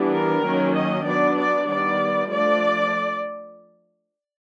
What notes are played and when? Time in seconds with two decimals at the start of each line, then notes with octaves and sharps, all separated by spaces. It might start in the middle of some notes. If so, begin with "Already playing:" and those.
Already playing: E3 G3 B3 D4
0.13 A#4
0.44 D#3 F#3 A#3 C#4
0.75 D#5
1.05 F#3 B3 D4 D5
1.37 D5
1.67 D#3 G3 B3 D5
2.29 F3 A3 D4 D5